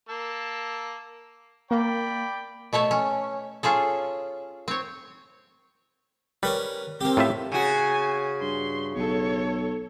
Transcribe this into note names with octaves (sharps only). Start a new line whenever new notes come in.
A#3 A5 E6
A#3 D5 G5 B5
B2 A3 A4 C#5
C#4
C#4 F4 G#4 A4
C4 C#5
G3 C#4 A#4 B4
A#3 C4 G4
A2 F4 E5
C#3 F#4 G#5
G2 C6
B1 A4 C#5